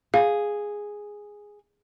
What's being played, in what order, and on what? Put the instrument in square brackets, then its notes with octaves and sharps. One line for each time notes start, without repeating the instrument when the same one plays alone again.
[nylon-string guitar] G#4 [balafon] F5